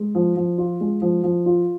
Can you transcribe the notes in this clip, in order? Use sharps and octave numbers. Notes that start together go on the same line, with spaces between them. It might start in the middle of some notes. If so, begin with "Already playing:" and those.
Already playing: G#3
F3
F3
F4
G#3
F3
F3
F4